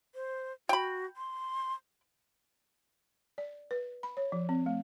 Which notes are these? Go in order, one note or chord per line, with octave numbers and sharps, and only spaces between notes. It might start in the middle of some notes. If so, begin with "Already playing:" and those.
C5
F#4 G5 B5
C6
D5
B4
B5
C#5
F3
C4
A3